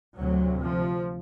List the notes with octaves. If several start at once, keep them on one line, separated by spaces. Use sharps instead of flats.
D2 C3 F#3
F3